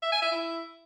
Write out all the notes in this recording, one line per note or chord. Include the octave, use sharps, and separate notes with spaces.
E5
G#5
E5
E4